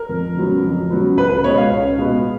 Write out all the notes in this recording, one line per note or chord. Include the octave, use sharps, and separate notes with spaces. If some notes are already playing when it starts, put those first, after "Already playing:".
Already playing: A#4
F2
C#3 F#3 B3
F2
C#3 F#3 B3
C#2 B4
B4
B2 G#3 B3 C#5
F5
C#2
B2 G#3 B3